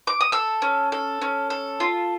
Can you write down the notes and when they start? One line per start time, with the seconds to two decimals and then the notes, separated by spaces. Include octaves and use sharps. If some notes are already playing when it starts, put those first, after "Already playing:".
0.07 D6
0.20 D#6
0.32 A4 E6
0.62 C#4
0.92 A4
1.21 C#4
1.50 A4
1.80 F4